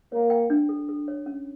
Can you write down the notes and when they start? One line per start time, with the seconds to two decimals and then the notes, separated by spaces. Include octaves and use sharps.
0.11 A#3 C#5
0.30 G5
0.50 D4
0.69 A4
0.89 A4
1.08 C#5
1.26 C#4